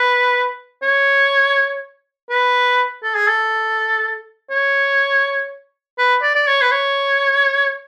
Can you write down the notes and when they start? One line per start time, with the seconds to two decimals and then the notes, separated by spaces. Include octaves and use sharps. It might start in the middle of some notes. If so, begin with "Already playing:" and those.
Already playing: B4
0.83 C#5
2.30 B4
3.03 A4
3.15 G#4
3.28 A4
4.50 C#5
5.98 B4
6.22 D5
6.35 D5
6.47 C#5
6.62 B4
6.72 C#5